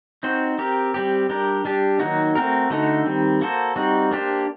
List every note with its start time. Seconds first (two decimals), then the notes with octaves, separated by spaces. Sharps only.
0.23 C4 D#4 F#4 C5
0.58 C4 G4 A#4
0.94 G3 C4 G4
1.29 G3 D4 G4 A#4
1.65 G3 D4 G4
2.00 D#3 F#3 A#3 D#4 F#4
2.35 A3 C4 F#4 A#4
2.70 D3 A3 D#4 F#4 A4
3.06 D#3 G3 C4
3.41 A#3 F#4 A4 C5
3.76 G3 C4 D#4 F#4
4.11 A#3 D4 G4 C5